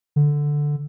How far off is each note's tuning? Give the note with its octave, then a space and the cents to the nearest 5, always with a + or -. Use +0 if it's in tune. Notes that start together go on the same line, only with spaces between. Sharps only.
D3 +0